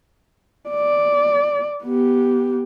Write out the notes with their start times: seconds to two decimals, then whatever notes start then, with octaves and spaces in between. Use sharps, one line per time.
0.70 D5
1.85 B3 G4